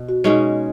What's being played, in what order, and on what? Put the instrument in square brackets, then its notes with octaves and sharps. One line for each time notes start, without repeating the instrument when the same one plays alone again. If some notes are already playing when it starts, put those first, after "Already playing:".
Already playing: [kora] B2
[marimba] F#4
[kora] B2 G#3 C#4 [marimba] D#4